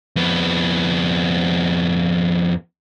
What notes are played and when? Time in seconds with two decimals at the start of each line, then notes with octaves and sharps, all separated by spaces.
0.16 F2 B3